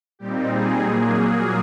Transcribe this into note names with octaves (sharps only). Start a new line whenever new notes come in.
A#2 G3 C4 D#4 G4
G#4
A#2 F#3 A#3 G#4